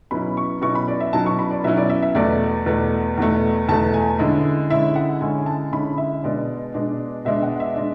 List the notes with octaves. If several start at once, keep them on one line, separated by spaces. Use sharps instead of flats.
B2 F#3 C#4 E4 B5
C#6
B2 F#3 C#4 E4 C#6
B5
D5
E5
B2 F#3 C#4 E4 A5
C#6
B5
D5
B2 F#3 C#4 E4 E5
D5
E5
E5
E2 B2 A3 D5
E2 B2 A3
E2 B2 A3
E2 B2 A3 A5
G#5
D3 G#3 C#4 E4
D3 G#3 C#4 E4 E5
F#5
D3 G#3 C#4 E4 G#5
G#5
A5
D3 G#3 C#4 E4 B5
E5
B2 G#3 D4 D5
B2 G#3 D4
B2 G#3 D4 E5
F#5
E5
G#3 D4